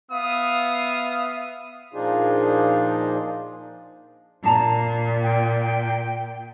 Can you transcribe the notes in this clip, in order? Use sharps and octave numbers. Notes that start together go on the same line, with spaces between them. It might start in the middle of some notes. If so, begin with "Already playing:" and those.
B3 E5 F5 D#6
A#2 F3 D4 D#4 F4 G#4
A#2 D4 A5 A#5
G5